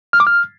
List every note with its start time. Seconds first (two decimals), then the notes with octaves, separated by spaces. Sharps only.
0.13 F6
0.20 D6
0.27 F6